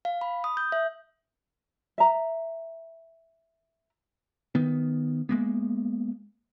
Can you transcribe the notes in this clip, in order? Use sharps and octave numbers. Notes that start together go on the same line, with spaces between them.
F5
B5
D#6
G6
E5
E5 A#5
D#3 B3
G#3 A#3 B3